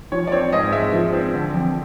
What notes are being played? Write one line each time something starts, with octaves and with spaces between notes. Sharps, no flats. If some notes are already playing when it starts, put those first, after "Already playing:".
F3 C#5
D5
C4 C#5
G#2 D#5
G#3 E5
F3
C4
D3
F2